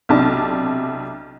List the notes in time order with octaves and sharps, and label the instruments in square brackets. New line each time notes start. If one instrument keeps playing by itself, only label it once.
[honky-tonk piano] B1 C3 D4 E4 A5